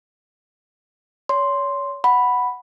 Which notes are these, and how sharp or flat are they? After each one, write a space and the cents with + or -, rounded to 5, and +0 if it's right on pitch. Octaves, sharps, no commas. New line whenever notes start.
C#5 +30 C6 +0
F#5 +0 B5 +0